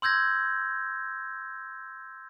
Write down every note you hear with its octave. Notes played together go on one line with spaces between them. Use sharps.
C6 E6 G6 G#6 A#6